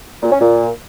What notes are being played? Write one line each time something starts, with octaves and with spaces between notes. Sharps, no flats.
A#2
C#4
A#2